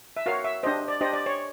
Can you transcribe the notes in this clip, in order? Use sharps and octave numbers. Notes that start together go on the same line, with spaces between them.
E5
F#4 A#4 C#5 F5
E5
D4 G4 C5 D#5
D5
D4 G4 C5 D#5
D5
C#5